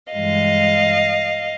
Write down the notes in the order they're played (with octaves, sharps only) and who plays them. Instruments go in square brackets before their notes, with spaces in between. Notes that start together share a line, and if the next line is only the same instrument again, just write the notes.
[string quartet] G2 E3 G#3 D#5 F5